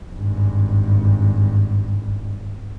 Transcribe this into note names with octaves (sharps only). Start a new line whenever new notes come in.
G#1 G2